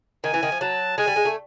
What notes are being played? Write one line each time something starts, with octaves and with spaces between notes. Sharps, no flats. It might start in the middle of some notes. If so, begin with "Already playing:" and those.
D#3 G#5
E3
D#3
F3
F#3 A5
G#3 G#5
G3
G#3
A3